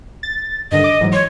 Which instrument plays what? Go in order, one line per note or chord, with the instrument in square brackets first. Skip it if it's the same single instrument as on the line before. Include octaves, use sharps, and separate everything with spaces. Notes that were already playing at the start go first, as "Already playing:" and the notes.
[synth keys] A6
[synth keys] G2 D3 D#3 [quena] D#5
[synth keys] D6
G#2 E3 F#3
[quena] C#5 [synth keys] C6